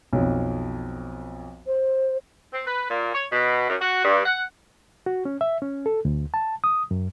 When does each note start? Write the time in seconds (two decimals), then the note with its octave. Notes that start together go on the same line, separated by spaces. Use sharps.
0.13 B1 F2
1.67 C5
2.53 C4
2.67 B4
2.89 A#2
3.14 C#5
3.32 B2
3.68 F#2
3.80 F#4
4.04 G2
4.25 F#5
5.06 F#4
5.25 C#4
5.41 E5
5.62 C#4
5.86 A4
6.05 D2
6.34 A5
6.64 D#6
6.91 F#2